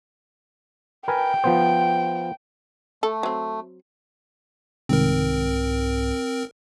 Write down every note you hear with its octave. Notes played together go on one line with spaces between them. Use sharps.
A#4 B4 G5 G#5
F3 B3 C5
A3 A4
F#3 C4
C2 G#2 D#3 C4 A#4